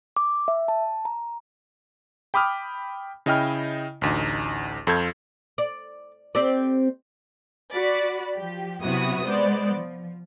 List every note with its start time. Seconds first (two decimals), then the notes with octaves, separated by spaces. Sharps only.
0.17 D6
0.48 E5
0.68 A5
1.05 A#5
2.34 G5 B5 D6 D#6 F6
3.26 C#3 E4 D#5 G5 F6
4.02 A1 D2 D#4
4.87 F2 F4 A4 G6 G#6
5.58 D5
6.35 C4 G4 D5
7.73 F#4 D5 B5
8.35 F3 G4
8.80 C3 F#3 B3 E4 F#4 D#6
9.26 G#3 B3 C5 D5
9.73 F3